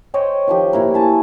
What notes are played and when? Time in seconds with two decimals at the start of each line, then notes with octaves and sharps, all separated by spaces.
0.14 C5 C#5 D#5 G5
0.48 D#3 F3 G4
0.73 A#2 E4 A#4
0.94 G#5 A5 B5